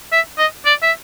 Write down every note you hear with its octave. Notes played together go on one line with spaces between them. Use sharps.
E5
D#5
D5
E5